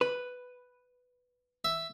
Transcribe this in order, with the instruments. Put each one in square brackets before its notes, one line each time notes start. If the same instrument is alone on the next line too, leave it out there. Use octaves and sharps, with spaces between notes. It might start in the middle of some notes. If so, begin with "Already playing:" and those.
[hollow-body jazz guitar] B4
[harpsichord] E5